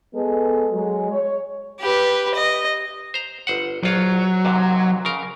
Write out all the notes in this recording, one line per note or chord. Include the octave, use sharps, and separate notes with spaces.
G#3 B3 A4
F#3 G#3
C#5
G4 B4
D#5
C5 A#5
G1 C5 F#5
A#1 F#3 F4
D#2 G#2 C3
C#3 A#4